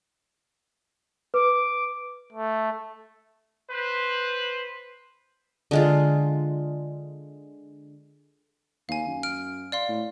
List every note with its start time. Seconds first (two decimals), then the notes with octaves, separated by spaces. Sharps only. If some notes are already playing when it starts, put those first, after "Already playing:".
1.34 B4 D6
2.33 A3
3.70 B4 C5
5.71 D3 G#3 F4
8.89 D#2 F5 G#5
9.07 F#2
9.23 F6 D7
9.72 D5 F5 C6
9.88 A2